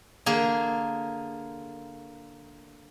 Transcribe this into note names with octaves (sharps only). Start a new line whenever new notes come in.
D3 A#3 G#4